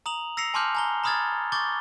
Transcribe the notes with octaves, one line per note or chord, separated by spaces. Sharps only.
A#5 D#6 F7 F#7
E6 A#6 C7 C#7 F7
G#5 A5 C6 D6 F6 G6
G#5 A#5 G7
A#5 B5 D#6 F6 G#6 A6
C#6 D6 G6 A6 G7